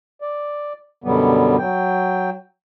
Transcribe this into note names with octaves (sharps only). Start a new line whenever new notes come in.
D5
F#2 B2 D3 F#3 G3 B3
F#3 G5